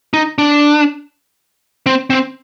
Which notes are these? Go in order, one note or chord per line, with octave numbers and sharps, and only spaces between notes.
D#4
D4
C4
C4